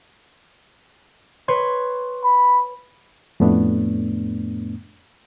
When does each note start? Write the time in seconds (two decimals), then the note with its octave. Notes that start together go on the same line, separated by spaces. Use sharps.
1.48 B4 C#5 C6
2.24 B5
3.40 F2 A2 A3 B3 D4